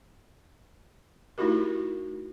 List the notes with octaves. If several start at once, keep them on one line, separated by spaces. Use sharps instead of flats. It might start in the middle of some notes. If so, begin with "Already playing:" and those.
A3 D#4 E4 F#4 G4 A#4